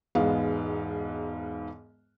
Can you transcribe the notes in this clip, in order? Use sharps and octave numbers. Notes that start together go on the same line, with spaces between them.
E1 G#2 G#3 B3 F5